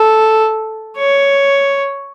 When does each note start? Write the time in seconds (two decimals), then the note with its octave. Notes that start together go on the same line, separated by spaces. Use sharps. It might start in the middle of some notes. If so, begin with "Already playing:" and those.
Already playing: A4
0.97 C#5